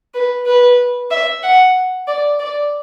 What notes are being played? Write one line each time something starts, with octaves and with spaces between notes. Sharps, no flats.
B4
B4
E5
F#5
D5
D5